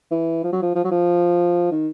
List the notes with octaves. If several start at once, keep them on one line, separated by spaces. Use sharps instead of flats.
E3
F3
F#3
F3
F3
F#3
F3
D#3